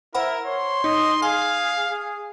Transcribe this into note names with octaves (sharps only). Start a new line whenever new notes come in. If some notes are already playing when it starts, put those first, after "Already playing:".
E4 A#4 C5 F#5 B5
C#5 C6
D#4 D#5
G#4 F5 G#5
G#4